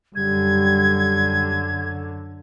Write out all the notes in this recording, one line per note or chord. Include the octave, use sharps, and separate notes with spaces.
F#2 D3 G3 G#6